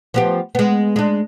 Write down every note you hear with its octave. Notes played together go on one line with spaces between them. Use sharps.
F3 B3 G4
G#3 B3
G#3 D4